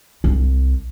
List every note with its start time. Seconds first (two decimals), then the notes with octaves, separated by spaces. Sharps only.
0.24 C2